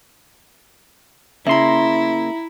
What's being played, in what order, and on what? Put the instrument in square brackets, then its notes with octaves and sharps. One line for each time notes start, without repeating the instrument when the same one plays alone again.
[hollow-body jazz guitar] C#3 [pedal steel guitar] A#3 C6 [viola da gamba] E4 [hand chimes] E5 A#5